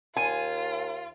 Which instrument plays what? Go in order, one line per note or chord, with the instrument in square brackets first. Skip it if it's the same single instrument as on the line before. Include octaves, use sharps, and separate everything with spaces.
[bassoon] D#2 [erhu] F4 [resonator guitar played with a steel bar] G#5